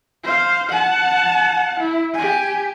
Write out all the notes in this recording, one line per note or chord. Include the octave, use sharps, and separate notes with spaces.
C5 F5
F#5 A5
E4
G4 G#5